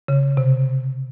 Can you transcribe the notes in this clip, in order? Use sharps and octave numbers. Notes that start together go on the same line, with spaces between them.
C#3
C3